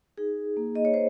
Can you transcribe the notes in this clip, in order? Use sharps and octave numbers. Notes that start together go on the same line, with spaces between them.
D#4 G#4
A#3
D#5
C#5
C5